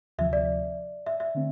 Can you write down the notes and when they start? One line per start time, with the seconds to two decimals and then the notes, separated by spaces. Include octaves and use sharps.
0.18 D2 C3 F3 E5
0.33 D5
1.07 E5
1.20 E5
1.35 D3 A3 C4